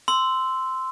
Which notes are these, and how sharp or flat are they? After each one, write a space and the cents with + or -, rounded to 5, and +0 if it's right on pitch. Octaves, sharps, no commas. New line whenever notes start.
C6 -10 E6 +0